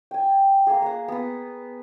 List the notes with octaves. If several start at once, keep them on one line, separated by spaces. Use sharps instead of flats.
G5 G#5
A#3 G#4
A#3 F#5
B3 B4